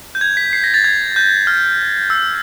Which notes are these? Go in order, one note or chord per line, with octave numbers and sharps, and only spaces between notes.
G6
G#6
B6
C7
A#6
A6
G#6
G6
F6
E6